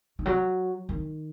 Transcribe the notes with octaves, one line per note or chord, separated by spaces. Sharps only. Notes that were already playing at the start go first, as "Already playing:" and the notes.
D#3
F#3
D#3